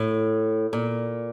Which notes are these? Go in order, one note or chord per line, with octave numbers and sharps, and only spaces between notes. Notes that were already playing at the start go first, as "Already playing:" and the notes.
Already playing: A2
A#2